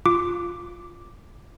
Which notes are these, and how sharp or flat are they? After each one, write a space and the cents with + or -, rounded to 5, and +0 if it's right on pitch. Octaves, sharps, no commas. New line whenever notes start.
F4 +0 D6 +0